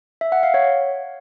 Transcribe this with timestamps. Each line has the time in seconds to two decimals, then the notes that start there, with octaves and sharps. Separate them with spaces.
0.21 E5
0.32 F#5
0.43 F5
0.54 C#5